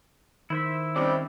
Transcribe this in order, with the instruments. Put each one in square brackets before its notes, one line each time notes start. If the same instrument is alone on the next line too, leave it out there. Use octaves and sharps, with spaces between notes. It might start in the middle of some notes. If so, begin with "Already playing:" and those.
[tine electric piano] D#3 [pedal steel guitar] E4 C5 E5
[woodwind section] C3 G3 C4 [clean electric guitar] C#4 D#4 D5